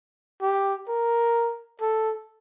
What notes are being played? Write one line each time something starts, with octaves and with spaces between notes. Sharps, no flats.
G4
A#4
A4